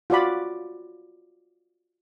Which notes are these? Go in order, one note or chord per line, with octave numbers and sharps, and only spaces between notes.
F4 F#4 D5 B5